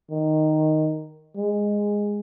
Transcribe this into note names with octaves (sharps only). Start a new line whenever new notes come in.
D#3
G#3